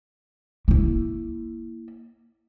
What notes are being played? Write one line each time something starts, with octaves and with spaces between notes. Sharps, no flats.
A#3 E4